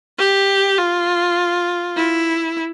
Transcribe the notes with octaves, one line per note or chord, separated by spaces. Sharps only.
G4
F4
E4